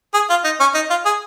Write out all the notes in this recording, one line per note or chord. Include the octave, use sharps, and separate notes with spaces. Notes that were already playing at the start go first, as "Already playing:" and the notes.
G#4
F4
D#4
C#4
D#4
F4
G#4